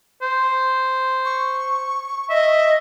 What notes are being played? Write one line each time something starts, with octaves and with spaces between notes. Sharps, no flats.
C5
C#6
D#5 E5